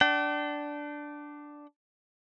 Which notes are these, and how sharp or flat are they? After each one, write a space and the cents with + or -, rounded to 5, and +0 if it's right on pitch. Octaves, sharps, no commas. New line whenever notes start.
D4 +0 G5 -45